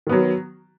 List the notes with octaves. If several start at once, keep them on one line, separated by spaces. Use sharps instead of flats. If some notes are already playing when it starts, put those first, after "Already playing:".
D#3 F#3 B3